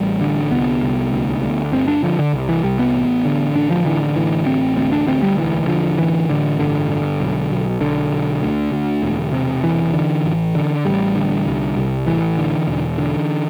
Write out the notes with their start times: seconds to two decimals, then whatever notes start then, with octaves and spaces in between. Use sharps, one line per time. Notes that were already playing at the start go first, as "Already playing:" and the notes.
Already playing: A1 G3
0.21 D3
0.51 C2 B3
0.82 C2
1.12 D2
1.42 D2
1.72 G1 C4
1.88 D4
2.03 D3 F3
2.19 D3
2.33 C2
2.49 E3
2.63 C2 G3
2.79 B3
2.94 A1
3.25 D3
3.55 A1 D4
3.71 F3
3.85 D3 E3
4.16 A1 E3
4.46 A1 C4
4.77 D2 C4
4.92 D4
5.07 D2 C4
5.23 G3
5.37 E1 E3
5.67 D3 F3
5.98 A1 E3
6.29 A1 D3
6.59 G1 D3
6.90 D3
7.20 B1
7.50 B1
7.80 B1 D3
8.11 B1
8.42 D2
8.72 D2
9.03 E1
9.33 C3
9.63 E1 E3
9.94 D3
10.24 A1
10.55 D3
10.85 A1 G3
11.15 D3
11.46 C2
11.76 C2
12.06 A1 E3
12.37 D3
12.68 E1
12.98 D3